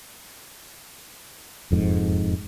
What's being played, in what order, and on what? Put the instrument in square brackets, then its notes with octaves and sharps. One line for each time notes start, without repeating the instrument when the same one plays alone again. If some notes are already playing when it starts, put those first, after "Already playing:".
[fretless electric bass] E1 F2 G#2